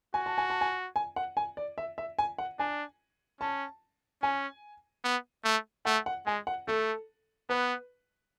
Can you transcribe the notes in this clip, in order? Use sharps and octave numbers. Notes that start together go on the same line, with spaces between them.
F#4 G#5
A5
G#5
A5
G#5
G#5
F#5
G#5
D5
E5
E5
G#5
F#5
D4 G#5
C#4 A5
C#4 G#5
B3
A3
A3 F#5
F#5
G#3 G#5
F#5
A3 A4
B3 B4